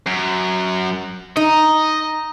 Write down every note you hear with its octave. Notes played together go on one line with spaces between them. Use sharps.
F#2
D#4 D#5